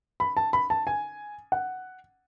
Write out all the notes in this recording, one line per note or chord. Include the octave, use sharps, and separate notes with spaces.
B5
A5
B5
A5
G#5
F#5